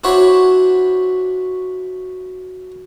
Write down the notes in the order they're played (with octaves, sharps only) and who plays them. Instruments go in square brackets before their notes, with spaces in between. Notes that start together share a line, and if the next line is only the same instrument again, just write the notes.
[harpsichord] D4 E4 F#4 C5 C#5 B5